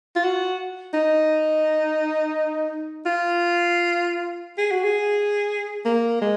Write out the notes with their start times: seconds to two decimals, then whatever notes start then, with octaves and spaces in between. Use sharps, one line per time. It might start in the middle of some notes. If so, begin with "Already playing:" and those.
0.16 F4
0.24 F#4
0.94 D#4
3.06 F4
4.58 G#4
4.71 F#4
4.84 G#4
5.85 A#3
6.21 G#3